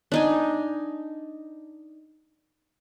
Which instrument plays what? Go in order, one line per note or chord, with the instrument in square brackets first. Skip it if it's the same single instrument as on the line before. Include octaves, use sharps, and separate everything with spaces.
[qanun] D4 D#4 G#5